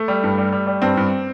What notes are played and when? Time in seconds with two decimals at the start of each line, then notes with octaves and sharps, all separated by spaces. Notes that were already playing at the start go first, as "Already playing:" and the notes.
Already playing: A3
0.08 G3
0.24 G2
0.38 G3
0.53 G3
0.67 G3
0.82 G2 C4
0.97 G2